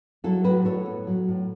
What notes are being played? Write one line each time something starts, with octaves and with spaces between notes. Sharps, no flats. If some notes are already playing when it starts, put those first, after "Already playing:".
F#3 E4 A4
A2 F#4 B4
A2 A4 C#5
B3
F#3
A2